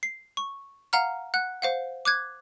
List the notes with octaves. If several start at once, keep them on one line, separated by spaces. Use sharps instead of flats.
C7
C#6
F5 F#5 A#5 F6
F#5 F#6
C5 F5 F#5
D6 F#6 G#6